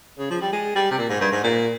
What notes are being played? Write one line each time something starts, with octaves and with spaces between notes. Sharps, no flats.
C#3
F3
G3
G#3
G3
C3
A#2
G#2
G2
G#2
A#2